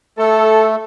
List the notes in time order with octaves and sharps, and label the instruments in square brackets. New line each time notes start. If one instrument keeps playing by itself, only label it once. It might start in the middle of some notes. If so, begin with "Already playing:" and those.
[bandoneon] A3 [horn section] A4